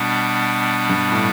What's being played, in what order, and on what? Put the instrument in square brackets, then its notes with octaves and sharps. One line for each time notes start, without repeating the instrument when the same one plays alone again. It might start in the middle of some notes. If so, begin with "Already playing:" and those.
Already playing: [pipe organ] B2 G3 B3 D4
[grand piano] G2
A2